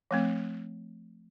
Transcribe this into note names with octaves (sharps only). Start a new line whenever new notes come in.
F3 A3 C4